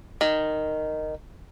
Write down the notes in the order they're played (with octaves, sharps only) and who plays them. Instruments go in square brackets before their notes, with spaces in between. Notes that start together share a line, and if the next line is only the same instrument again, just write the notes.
[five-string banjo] D#3